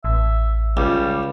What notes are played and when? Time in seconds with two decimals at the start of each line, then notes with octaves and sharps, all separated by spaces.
0.04 A1 E5
0.77 C#2 G3